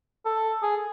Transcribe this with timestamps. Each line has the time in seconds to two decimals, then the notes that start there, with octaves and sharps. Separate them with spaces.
0.26 A4
0.63 G#4